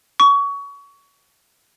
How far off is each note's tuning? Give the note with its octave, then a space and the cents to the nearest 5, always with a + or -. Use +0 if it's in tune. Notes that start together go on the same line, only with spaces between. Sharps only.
C#6 +25